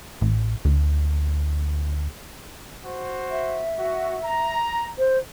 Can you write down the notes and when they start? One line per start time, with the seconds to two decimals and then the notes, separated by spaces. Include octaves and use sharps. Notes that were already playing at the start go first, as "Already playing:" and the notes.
0.21 A1
0.65 D2
2.83 F#4 C5
3.31 E5
3.77 F#4
4.24 A#5
4.98 C5